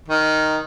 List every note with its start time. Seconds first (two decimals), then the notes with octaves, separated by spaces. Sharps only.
0.09 D#3